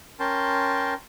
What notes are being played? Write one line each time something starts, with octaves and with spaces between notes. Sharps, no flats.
C#4 A#4 G5 A5 C6